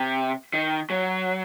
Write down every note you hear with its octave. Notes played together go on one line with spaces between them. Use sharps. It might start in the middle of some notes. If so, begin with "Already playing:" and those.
Already playing: C3
D#3
F#3